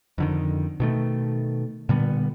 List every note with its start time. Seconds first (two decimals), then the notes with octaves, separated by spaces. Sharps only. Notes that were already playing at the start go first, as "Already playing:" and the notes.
0.18 F2 D3 D#3
0.80 B2 D#3 A3
1.89 A#2 D3 G3 B3